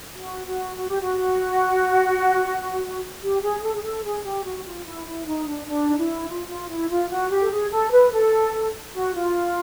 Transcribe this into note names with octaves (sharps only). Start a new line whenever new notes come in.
F#4
F#4
F#4
G4
F#4
G4
G#4
A4
G#4
A4
G#4
G4
F#4
F4
E4
E4
D#4
D4
D4
D#4
E4
F4
F4
E4
F4
F#4
G4
A4
G#4
A4
B4
A4
F#4
F4